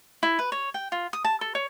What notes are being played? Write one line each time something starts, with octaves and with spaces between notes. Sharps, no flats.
E4
B4
C#5
G5
F4
D#6
A5
A4
C#5